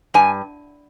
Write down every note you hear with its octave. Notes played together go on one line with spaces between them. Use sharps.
G2 G#5